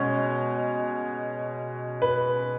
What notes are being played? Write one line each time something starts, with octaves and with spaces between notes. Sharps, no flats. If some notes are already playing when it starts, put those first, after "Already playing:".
Already playing: B2 G#3 C#4 C#5
B4